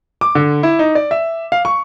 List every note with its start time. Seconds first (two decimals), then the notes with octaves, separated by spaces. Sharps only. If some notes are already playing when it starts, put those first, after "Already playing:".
0.21 D6
0.35 D3
0.63 E4
0.79 D#4
0.95 D5
1.11 E5
1.52 F5
1.65 C#6